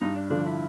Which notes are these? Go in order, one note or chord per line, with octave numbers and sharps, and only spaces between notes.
G2 D#4
D4
D3 F3 D4
E4